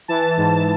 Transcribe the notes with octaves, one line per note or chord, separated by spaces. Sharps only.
E3 A5
G#2